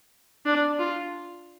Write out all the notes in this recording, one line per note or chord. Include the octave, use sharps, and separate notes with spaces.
D4
F4